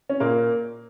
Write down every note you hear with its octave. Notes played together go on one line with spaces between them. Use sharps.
C#4
A#2 A#3